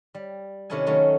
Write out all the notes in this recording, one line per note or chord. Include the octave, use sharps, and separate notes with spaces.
G3
C3 D#3 C#4 E4 A4 G#5
D#3 F#3 A3 C#4